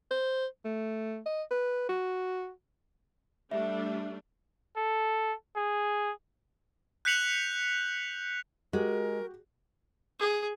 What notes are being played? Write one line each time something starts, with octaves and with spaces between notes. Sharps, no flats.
C5
A3
D#5
B4
F#4
G3 A3 D4 E5
A4
G#4
F#6 G6 B6 C#7 F7 F#7
G#3 F#4 G4 A#4
G#4